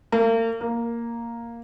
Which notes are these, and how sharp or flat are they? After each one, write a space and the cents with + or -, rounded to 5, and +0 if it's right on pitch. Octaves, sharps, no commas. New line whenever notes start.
A#3 -40
A#3 +0